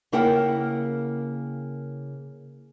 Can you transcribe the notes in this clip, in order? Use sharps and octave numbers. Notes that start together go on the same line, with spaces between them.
C#3 A#3 E4 A#4 F#5 G5